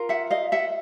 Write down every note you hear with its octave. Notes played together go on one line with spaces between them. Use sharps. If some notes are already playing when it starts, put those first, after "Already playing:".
Already playing: F4 A#4
E5 F#5
D#5 F5
E5 F#5